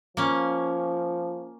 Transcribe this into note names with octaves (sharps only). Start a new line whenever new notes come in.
F3 A#3 C#4